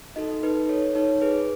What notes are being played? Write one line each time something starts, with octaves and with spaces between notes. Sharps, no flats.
D#4 F#4 A4 D#5
D#4 B4
A4 C#5
D#4 C#5
G#4 B4